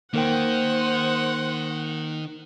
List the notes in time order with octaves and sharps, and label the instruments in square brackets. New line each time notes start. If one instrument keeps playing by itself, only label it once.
[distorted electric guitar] D#3 [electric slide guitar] A#3 A#4 G5 [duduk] C5 [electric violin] F#5